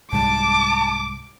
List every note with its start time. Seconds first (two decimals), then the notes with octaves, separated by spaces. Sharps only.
0.12 C2 G#2 G3 A5 D6